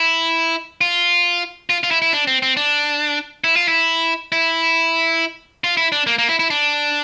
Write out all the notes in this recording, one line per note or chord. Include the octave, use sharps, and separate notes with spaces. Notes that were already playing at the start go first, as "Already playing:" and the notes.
Already playing: E4
F4
F4
F4
E4
E4
D4
C4
C4
D4
E4
F4
E4
E4
F4
E4
D4
A#3
A#3
E4
E4
D4